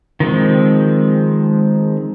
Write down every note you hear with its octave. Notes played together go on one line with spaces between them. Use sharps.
D#3 F3 G#3 C4